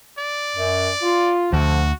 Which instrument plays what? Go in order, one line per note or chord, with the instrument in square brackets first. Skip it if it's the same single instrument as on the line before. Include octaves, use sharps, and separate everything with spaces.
[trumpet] D5
[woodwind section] F#2
F4
[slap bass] D2 [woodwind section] D3 F3 [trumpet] F#4